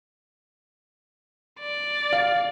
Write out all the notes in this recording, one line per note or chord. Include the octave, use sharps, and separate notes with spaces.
D5
F5